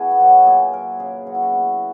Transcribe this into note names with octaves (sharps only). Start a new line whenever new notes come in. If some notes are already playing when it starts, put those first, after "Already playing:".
Already playing: B2 E4 F#4 G#4
B3
F#3
B3
A#2 G#4
F#3 A#4
C#3 G#4
F#3 F#4
E4
F#4
B2